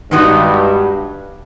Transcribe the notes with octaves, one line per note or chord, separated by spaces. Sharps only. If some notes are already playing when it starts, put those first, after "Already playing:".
G2 D#3 G#3 B3 D#4 F#4